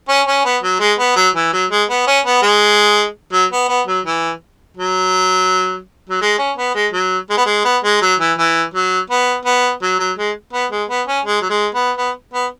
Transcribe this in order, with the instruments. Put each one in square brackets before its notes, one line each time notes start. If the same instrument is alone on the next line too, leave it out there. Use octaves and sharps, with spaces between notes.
[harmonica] C#4
C#4
B3
F#3
G#3
B3
F#3
E3
F#3
G#3
B3
C#4
B3
G#3
F#3
B3
B3
F#3
E3
F#3
F#3
G#3
C#4
B3
G#3
F#3
G#3
B3
G#3
B3
G#3
F#3
E3
E3
F#3
B3
B3
F#3
F#3
G#3
B3
G#3
B3
C#4
G#3
F#3
G#3
B3
B3
B3